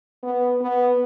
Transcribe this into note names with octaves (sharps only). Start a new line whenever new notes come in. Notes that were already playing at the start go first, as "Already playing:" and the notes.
B3
B3